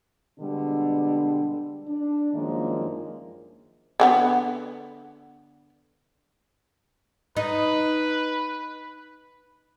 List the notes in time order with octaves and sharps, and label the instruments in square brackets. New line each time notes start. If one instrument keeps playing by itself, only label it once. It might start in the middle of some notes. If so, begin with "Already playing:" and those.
[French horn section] B2 D3 G3 G#3 D4
D4
F#2 D#3 F3 G#3 A#3 D4
[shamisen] D3 G#3 B3
[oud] D#4 [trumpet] B4